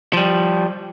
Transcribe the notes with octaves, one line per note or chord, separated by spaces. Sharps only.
F3 G3